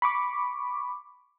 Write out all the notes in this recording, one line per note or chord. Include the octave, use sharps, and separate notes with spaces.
B5 C#6 D6